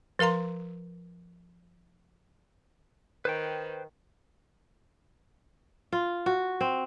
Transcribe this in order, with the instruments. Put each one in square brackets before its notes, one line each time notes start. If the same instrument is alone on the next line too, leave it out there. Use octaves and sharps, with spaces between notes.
[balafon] F3 A#4 F5 A#5 C6
[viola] D#3 [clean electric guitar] B4 C5 G5
[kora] F4
F#4
C4